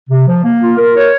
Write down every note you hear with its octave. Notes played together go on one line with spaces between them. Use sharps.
C3
F3
A#3
F4
A#4
C#5